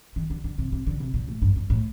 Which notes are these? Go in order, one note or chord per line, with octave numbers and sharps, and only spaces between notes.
D#3
D3
D3
C3
C3
D3
C3
A#2
A2
G2
G2
A2